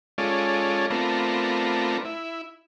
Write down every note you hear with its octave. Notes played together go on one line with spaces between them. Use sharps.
G#3 C#4 F4 A4 D5
A3 B3 C4 D4 F4 A#4
E4